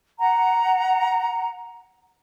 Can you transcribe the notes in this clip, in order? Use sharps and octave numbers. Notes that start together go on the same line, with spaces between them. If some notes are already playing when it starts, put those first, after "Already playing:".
F#5 A#5